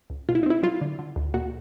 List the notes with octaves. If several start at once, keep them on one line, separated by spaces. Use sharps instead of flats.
C#2
B2 F4
E4
D#4
C4 E4
F#3 F4
D3
D3
D2
A#2 F#4